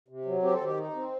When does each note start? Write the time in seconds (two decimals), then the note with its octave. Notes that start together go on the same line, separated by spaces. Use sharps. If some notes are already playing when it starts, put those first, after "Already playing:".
0.08 C3
0.26 F#3
0.42 C4 G4
0.54 A4
0.61 D#3 G4
0.77 D#4
0.95 C4